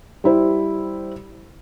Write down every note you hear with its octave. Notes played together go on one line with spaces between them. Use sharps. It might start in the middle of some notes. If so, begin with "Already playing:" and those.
G3 E4 C5